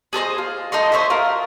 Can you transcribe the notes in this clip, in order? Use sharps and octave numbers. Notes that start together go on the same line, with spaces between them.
G#4 A4 C5 D#5
F4
D#4 A4 D#5 C6
C5 C#5 D#5 E5
F4 A#4